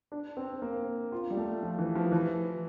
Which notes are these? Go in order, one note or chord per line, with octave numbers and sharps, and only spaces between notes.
D4
C4
A#3
F4
G3
A3
F3
E3
F3
E3